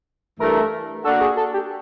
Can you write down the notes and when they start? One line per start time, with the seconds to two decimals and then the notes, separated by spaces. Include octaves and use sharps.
0.40 G2 E3 A3 A#4
1.05 A#3 D4 F#4 A4
1.21 G#4
1.37 A4
1.54 G4